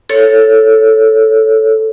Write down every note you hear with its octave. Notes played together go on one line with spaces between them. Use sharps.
A4 C#5